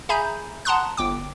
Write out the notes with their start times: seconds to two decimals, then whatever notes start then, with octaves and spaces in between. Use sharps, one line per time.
0.09 G#4 E5 G#5 A#5 B5 G6
0.65 F#5 A5 A#5 C6 D#6 F#6
0.97 G1 G5 D6